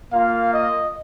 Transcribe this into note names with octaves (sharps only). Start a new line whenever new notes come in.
A#3 F4 F5
D#5